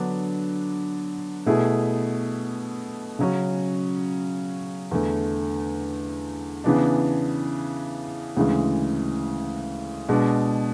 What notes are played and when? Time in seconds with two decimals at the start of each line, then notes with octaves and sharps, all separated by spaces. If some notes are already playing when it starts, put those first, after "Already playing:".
Already playing: D3 F#3 B3 D4
1.46 B2 A3 E4 G#4
3.19 C#3 F#3 C#4 F#4
4.91 E2 D3 A3
6.64 C#3 E3 B3 D4
8.37 D2 C#3 E3 G#3
10.09 B2 G#3 D4